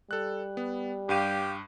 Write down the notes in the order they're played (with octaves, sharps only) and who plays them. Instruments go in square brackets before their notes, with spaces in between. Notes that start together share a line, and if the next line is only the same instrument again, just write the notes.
[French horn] G3 [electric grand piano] A4 F#6
[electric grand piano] B3
[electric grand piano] G2 D#7 [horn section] G4 F5